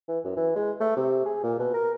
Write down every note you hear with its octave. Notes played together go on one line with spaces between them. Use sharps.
E3
F#2
E3
G#3
A3
C3
G#4
A#2
B2
A#4